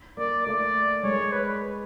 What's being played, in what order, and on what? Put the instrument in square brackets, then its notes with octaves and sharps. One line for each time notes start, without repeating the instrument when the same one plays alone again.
[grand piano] A#3 [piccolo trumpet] D5
[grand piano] A3 [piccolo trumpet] D5
[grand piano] G#3 [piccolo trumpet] C#5
[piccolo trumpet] B4